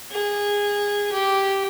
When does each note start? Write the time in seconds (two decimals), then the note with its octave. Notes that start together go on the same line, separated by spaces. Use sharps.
0.12 G#4
1.12 G4